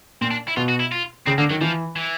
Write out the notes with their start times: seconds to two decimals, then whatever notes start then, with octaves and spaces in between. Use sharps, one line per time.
0.21 A#2 C4
0.31 D4
0.48 E4
0.57 B2 F4
0.68 F#4
0.80 E4
0.92 F4
1.26 C#3 C4
1.38 D3 A#3
1.50 D#3 F#3
1.61 E3 F3
1.96 E3